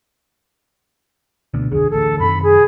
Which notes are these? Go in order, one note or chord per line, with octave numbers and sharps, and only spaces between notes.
D2 B2 D3
B1 F2 D3 G#4
A1 D2 A4
F#2 C3 D#3 B5
G#4